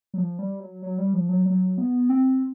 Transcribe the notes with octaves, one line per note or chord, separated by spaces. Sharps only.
F#3
F3
G3
F#3
F#3
G3
F3
F#3
F#3
B3
C4